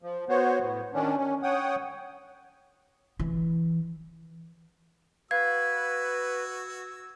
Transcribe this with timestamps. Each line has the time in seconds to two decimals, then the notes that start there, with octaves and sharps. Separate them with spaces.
0.02 F3
0.29 B3 F#4 C5 C#5
0.61 A2 B3
0.94 D#3 C#4 D4
1.17 C#4
1.43 C#5 F#5 G5 D#6
3.19 E3
5.31 F#4 B4 F5 E6 G#6